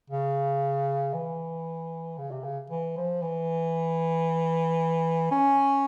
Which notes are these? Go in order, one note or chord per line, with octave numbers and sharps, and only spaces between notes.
C#3
E3
C#3
C3
C#3
E3
F3
E3
C#4